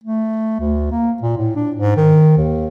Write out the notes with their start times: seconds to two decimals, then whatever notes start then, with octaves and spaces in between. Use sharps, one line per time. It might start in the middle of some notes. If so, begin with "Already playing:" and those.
0.04 A3
0.59 D2
0.92 A#3
1.22 A#2
1.37 A2
1.56 D4
1.76 G#2
1.96 D#3
2.37 D#2